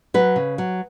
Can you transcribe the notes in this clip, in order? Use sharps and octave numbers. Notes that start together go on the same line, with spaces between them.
F#3 B4
C#3
F#3